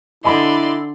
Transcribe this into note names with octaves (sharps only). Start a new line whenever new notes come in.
D3 E4 D5 D#5 G#5 B5 C6